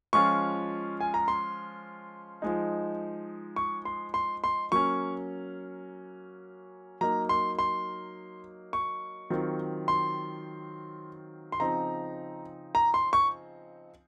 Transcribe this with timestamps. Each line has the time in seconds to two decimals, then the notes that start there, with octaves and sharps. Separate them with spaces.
0.13 F3 G#3 C#4 F4 C#6
1.01 G#5
1.14 A#5
1.28 C6
2.42 F3 G#3 D#4
3.56 C#6
3.85 C6
4.14 C6
4.44 C6
4.72 F#3 A#3 C#4 C#6
7.01 F#3 A#3 D#4 A#5
7.29 C6
7.59 C6
8.73 C#6
9.30 D#3 F#3 C4 F4
9.88 C6
11.52 C6
11.60 C#3 F3 C4 D#4 A#5
12.75 A#5
12.94 C6
13.13 C#6